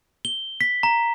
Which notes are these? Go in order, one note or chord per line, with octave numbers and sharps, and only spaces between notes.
G7
B6
A#5